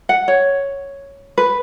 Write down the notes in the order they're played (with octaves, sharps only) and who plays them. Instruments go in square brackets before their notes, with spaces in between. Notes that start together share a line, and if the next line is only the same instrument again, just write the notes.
[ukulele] F#5
C#5
B4